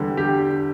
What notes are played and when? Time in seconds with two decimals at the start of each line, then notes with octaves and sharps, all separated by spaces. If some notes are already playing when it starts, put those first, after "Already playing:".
Already playing: E2 D3 G3
0.17 G4